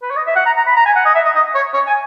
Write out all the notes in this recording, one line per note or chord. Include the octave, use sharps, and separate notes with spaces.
B4
C#5
D#5
E5
F#5
A#5
A#5
B5
A#5
G#5
F#5
D#5
E5
D#5
D#5
C#5
C#5
G#5